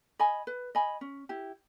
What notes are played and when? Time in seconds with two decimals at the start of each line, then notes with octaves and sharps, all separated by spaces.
0.19 D#5 G#5 B5
0.47 B4
0.75 D#5 G#5 B5
1.01 C#4
1.29 E4 G4